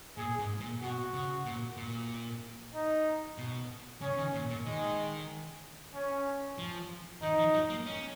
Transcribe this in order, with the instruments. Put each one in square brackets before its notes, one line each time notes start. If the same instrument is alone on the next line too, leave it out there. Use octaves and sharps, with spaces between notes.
[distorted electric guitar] A#2 [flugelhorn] G#4
[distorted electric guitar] G#2
A#2
[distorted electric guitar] B2 [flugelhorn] F#4
[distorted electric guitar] C#3
A#2
A#2
[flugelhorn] D#4
[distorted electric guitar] B2
[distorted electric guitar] C#3 [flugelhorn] C#4
[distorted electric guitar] D#3
A#2
A#2
[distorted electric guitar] D#3 [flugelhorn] G#3
[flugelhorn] C#4
[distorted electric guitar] F3
[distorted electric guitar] D#3 [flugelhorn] D#4
[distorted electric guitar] F3
F#3
A#3
C#4